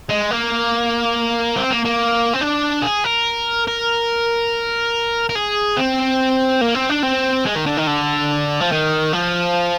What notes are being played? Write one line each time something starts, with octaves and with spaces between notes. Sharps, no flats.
G#3
A#3
C4
A#3
A#3
C4
D4
G#4
A#4
A#4
A#4
G#4
C4
A#3
C4
D4
C4
G#3
D#3
D3
D#3
D3
F3
D#3
F3